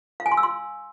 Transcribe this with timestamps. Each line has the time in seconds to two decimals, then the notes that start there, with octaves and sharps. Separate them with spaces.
0.20 F5
0.26 G#5
0.32 C6
0.37 E6
0.43 C6